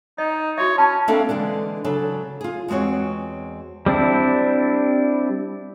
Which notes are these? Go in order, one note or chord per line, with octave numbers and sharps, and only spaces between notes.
D#4 D#5
E4 F#4 C#5 E5
C#4 A5 B5
A#3 C4 D4 A4 E5 F5
D3 E3 G#3 D4
C#3 F#3 D4 A4
F4 G#4
E2 G#3 C4 F#4 C#5
G3 C4 D4 E4